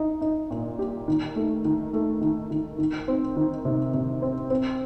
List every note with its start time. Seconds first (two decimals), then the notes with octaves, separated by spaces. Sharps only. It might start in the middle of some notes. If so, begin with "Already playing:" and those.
Already playing: D#4
0.22 D#4
0.51 A#2
0.79 G4
1.08 D#3
1.36 A3
1.65 D#3
1.93 A3
2.21 D#3
2.51 D#3
2.78 D#3
3.08 C4
3.37 D#3
3.65 C3
3.94 C3
4.22 C4
4.50 C4